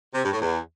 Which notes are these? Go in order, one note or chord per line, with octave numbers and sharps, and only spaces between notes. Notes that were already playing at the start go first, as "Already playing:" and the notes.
C3
G2
A2
E2